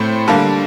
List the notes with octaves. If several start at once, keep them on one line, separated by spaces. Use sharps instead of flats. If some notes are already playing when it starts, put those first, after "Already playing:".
Already playing: A2 A3 C4 C5
D3 G3 A#3 A5